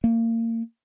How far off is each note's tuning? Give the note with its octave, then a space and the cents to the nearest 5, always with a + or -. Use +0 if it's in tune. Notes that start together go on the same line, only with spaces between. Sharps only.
A#3 -30